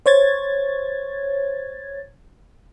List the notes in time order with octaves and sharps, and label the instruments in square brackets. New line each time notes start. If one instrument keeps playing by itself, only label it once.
[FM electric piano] C5 C#5 G#6 A6